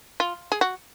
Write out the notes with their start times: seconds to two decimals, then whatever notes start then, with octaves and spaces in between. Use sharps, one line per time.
0.20 F4
0.52 G#4
0.61 F#4